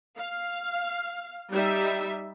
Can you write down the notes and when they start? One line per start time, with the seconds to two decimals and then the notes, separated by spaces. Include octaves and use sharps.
0.18 F5
1.51 G3 D#4 E5